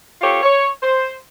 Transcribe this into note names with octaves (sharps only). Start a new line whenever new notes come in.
C4 F4 G4 A4 C#5
C#5
C5